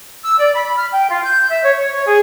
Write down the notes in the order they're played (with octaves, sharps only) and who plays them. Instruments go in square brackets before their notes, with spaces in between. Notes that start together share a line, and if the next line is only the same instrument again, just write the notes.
[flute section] E6
D5
B5
F6
G5
F4
G6
E5
C#5
C#5
C#5
G#4